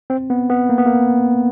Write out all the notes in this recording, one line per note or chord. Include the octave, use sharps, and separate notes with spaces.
C4
B3
B3
A#3
B3
A#3